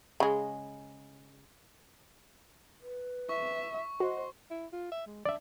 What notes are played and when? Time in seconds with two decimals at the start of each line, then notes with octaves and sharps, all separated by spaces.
0.20 C#3 G#3
2.82 B4
3.29 E5 C#6
4.00 F#4 C5 D#5
4.50 E4
4.73 F4
4.92 E5
5.06 G#3
5.25 D4 D5 E5